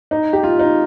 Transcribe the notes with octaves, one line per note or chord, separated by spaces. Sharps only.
D#4
G4
F4
D#4